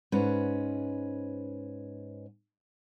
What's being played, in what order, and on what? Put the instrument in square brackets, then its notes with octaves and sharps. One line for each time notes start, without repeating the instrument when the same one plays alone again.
[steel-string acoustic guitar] G#2 C#4 B4